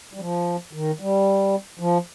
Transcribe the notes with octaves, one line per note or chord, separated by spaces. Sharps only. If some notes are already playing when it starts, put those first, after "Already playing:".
G3
F3
D#3
G3
F3